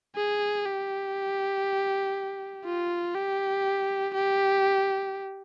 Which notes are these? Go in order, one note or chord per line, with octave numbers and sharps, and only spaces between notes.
G#4
G4
F4
G4
G4